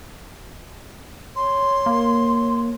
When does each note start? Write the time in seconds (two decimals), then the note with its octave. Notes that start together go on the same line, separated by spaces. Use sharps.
1.36 C#5 C6
1.86 A#3